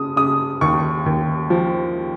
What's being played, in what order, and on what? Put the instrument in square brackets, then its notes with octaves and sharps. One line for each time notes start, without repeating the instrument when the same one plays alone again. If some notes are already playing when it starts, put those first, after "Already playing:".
Already playing: [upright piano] C#3 D#6
C#3 D#6
D#2 C#6
D#2
F3